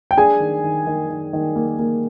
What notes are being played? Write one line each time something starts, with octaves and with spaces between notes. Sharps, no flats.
G5
D4 G#4 G#5
D#3
D#3
D#3
D#3
D#3
A#3
A#3